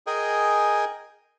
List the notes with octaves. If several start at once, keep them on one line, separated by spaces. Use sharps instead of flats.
G#4 A#4 D#5 G5 G#5